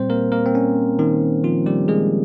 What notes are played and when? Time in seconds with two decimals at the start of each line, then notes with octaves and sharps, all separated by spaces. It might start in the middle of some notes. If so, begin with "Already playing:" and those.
Already playing: A#2 G3 C4 C5
0.10 A#3 A#4
0.32 A#3 A#4
0.46 C4
0.55 C#4
0.99 D#3 D#4
1.44 F3 F4
1.66 G3 G4
1.88 G#3 G#4